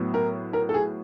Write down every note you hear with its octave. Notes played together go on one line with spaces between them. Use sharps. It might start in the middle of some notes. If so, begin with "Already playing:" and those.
Already playing: A2 F#3 B3
A#4
A#4
A4
G#4